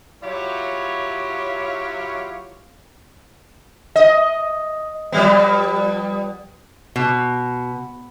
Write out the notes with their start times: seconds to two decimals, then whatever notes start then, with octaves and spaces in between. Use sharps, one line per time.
0.23 F#3 E4 F4 G4 C#5
3.96 D#5
5.12 F3 G3 B3
6.96 B2